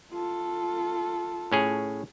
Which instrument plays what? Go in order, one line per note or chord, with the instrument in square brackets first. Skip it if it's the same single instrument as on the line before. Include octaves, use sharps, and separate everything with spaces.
[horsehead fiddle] F4 A4
[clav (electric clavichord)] A2 C#4 G#4